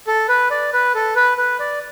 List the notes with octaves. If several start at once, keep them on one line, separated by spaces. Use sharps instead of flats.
A4
B4
D5
B4
A4
B4
B4
D5